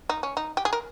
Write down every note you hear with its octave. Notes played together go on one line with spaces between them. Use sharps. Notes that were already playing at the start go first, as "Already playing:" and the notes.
D#4
C#4
D#4
G4
G#4
A#4